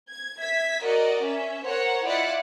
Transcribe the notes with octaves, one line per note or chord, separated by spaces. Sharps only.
G#6
E5 G#6 B6
F#4 A#4 D5 D#5
C#4 E5
A#4 C5 C#5 F#5
E4 F4 D5 D#5 F#5